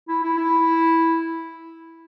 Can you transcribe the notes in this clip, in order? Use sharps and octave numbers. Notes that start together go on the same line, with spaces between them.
E4
E4
E4